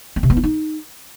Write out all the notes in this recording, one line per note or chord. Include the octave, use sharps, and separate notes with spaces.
C4
C3
B3
E4
D#4